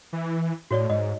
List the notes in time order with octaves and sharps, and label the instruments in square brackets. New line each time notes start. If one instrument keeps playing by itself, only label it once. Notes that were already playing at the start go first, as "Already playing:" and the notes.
[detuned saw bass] E3
[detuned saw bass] A2 [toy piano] F#4 C#5 D5
[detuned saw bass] G#2 [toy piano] D#5